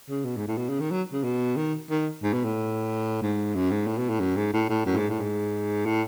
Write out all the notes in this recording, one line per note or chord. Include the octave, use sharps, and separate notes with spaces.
C#3
B2
G#2
A2
B2
C#3
D#3
F#3
C#3
B2
D#3
D#3
G#2
B2
A2
G#2
F#2
G#2
A2
B2
A2
F#2
G#2
A2
A2
F#2
A2
G#2
A2
G#2
A2